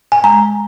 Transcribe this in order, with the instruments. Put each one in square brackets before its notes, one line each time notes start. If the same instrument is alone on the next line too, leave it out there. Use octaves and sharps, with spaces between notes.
[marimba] G#5
G#3 A#5